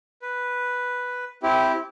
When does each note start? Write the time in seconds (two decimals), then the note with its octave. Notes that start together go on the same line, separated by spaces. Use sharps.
0.22 B4
1.43 C4 E4 G4